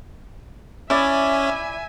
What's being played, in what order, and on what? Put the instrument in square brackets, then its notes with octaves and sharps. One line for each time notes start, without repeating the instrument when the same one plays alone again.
[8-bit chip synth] C#4 [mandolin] E4 D5 [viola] E5 G#5